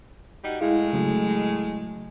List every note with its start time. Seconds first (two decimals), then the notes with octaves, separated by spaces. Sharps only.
0.44 G3 D#4 F#4
0.61 A2 G#3 E4 G#4 F5
0.93 C#3 F#3 A3